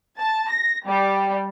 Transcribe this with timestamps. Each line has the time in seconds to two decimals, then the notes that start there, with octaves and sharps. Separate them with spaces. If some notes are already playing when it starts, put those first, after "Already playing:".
0.18 A5
0.50 A#6
0.85 G3